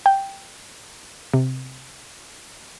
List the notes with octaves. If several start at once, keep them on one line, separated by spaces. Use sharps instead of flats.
G5
C3